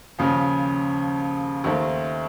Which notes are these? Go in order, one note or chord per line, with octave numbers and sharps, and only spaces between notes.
D#2 C#3 F3
D#2 D#3 A3 C4